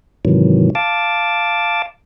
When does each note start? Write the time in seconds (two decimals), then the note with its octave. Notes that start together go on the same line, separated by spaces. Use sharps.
0.25 G#2 C3 D#3 E3 F#3
0.75 F5 A5 D6